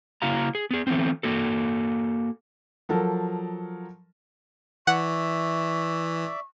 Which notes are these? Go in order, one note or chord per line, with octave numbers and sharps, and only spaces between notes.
C#3 A#3 E4 F#4 F5 A#5
G#4
B3 G#4
E3 A3 B3 C4
A#3 F#4 A4
F3 F#3 A4 A#4
E3 D5 E5 F#5 C#6